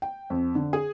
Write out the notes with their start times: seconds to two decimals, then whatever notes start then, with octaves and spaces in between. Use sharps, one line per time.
0.02 G5
0.30 F2
0.55 D3
0.73 G#4